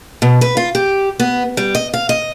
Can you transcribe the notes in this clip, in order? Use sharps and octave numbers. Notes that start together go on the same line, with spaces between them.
B2
B4
F4
G4
B3
G3
D#5
F5
D#5